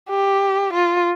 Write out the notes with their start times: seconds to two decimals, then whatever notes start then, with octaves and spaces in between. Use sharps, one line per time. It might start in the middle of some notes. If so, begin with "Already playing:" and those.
0.09 G4
0.73 F4